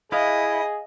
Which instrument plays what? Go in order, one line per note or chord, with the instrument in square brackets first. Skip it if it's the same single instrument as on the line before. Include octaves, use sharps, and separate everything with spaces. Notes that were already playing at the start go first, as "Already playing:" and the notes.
[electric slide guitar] E4 [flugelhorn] G#4 [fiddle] D#5 [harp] F5 D#6 F#6